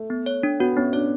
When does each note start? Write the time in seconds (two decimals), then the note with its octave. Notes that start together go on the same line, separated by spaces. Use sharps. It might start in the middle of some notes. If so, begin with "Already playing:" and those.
Already playing: A3
0.10 B3
0.26 C#5
0.43 D4
0.60 B3 F#4
0.77 B3 C#4
0.93 D4 C#5